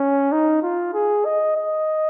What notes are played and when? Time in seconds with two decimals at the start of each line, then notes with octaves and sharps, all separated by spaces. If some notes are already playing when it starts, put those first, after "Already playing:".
Already playing: C#4
0.32 D#4
0.62 F4
0.94 G#4
1.25 D#5
1.56 D#5